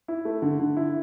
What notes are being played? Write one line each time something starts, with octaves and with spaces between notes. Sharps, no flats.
E4
A3
D3
D3
E4